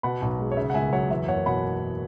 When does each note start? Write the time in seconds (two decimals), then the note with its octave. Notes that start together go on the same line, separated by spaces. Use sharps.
0.03 B2 F#5 B5
0.22 B1
0.39 G#3
0.51 C#5
0.57 C#3 E5
0.70 F#5
0.74 C#2 E5 G#5
0.93 F#3 C#5 F#5
1.10 E2 E5
1.28 F#1 C#5 F#5
1.46 B2 F#5 B5